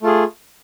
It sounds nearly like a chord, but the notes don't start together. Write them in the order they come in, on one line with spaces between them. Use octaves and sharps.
A3 F4 G#4